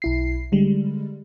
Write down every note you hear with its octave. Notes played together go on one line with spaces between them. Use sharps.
B1 E4 C7
D3 G3 G#3